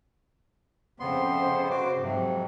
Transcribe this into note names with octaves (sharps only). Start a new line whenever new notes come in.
F2 C#3 B3 C5 C6
F#4 D6
F2 G#2 C3 F#3